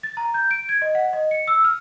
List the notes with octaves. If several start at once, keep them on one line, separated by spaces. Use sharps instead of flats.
A6
A#5
G6
D7
G#6
D#5
F#5
D#5
C#7
E6
F6